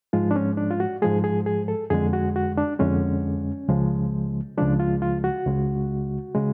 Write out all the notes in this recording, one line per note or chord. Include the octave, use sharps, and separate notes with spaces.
G#2 F3 G#3 F4
D4
C#4
D4
F4
F#4
G#2 F3 G#3 G#4
G#4
G#4
A4
F2 D3 G#3 G#4
F#4
F#4
D4
F2 D3 G#3 C#4
C#2 C#3 F3 G#3
C#2 C#3 F3 G#3 D4
F4
F4
F#4
C#2 C#3 G#3
C#3 G#3